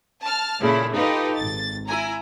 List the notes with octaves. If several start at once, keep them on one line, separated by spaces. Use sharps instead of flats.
A5 F6
A#2 C#3 E4 A4
D#4 F4 G4 A4 B4 D#5
G#1 A6
E4 G#5 A#5